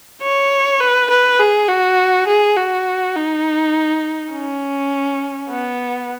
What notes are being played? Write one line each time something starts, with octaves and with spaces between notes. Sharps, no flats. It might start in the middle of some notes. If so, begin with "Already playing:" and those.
C#5
B4
B4
G#4
F#4
G#4
F#4
D#4
C#4
B3